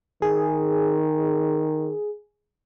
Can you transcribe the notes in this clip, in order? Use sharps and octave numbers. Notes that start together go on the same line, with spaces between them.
D#3 G#4